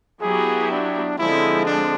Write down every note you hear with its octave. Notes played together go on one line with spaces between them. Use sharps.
F#3 B3 E4 G4 G#4
D4
D3 F3 G#3 C4 E4
D4